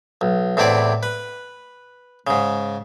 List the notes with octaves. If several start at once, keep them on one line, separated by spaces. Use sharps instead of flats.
B1
E2 A2 C4 E4 D5 D6
B4
G#2 C#3